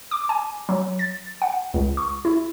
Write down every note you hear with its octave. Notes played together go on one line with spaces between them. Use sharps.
D6
G#5
F#3
A6
F#5
C#2
C#6
E4